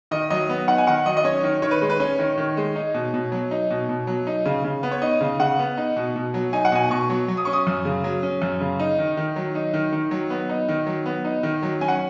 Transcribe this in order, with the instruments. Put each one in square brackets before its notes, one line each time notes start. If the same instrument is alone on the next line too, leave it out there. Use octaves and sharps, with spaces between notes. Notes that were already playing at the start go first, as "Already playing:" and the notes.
[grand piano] D#3 D#5
F#3 D#5
B3
D#4 F#5
G#5
D#3 F#5
F#3 D#5
D#5
C#4 C#5
D#3
D#3 C#5
B4
G#3
B4
C#4 C#5
D#3
D#3
G#3
D#4
B2
B2
F#3
D#4
B2
B2
F#3
D#4
C#3
C#3
B3
C#5
D#4 D#5
C#3
C#3 F#5
B3
D#4
B2
B2
F#3
D#4 G#5
F#5
B2 G#5
B2 C#6
F#3
F#3
D#6
C#4 C#6
D#6
F#2
C#3
F#3
C#4
F#2
C#3
D#4
D#3
D#3
F#3
D#4
D#3
D#3
F#3
B3
D#4
D#3
F#3
B3
D#4
D#3
F#3
C#4 G#5
F#5